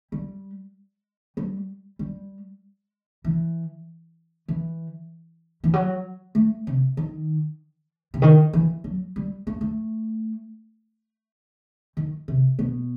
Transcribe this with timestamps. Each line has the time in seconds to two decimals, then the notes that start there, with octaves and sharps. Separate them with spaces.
0.12 G3
1.37 G3
1.99 G3
3.24 E3
4.48 E3
5.64 E3
5.73 F#3
6.35 A3
6.67 C3
6.97 D#3
8.14 C3
8.22 D#3
8.53 E3
8.84 F#3
9.16 G3
9.47 A3
9.61 A3
11.97 D#3
12.28 C3
12.59 B2